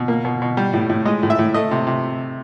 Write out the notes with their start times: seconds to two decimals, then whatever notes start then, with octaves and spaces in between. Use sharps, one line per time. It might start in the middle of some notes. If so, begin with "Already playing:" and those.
Already playing: B2
0.08 A#3
0.25 B2
0.42 B2
0.57 G3
0.73 A2
0.89 A2
1.05 G#3 D#5
1.23 A2
1.30 E5
1.39 A2
1.54 A3 D#5
1.71 C3
1.87 C3